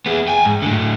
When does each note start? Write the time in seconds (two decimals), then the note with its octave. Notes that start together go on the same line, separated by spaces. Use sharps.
0.06 B3 G#4
0.28 G5 G#5
0.45 G#2
0.62 A2 D3